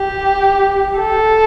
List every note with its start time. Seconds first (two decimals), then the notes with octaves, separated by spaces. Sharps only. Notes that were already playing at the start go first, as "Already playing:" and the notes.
Already playing: G4
0.99 A4